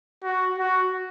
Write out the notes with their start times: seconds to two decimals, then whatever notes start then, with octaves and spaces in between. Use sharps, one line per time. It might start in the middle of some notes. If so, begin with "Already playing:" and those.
0.23 F#4
0.59 F#4